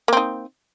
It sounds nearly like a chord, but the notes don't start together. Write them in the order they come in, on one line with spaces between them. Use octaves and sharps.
A#3 C4 D#4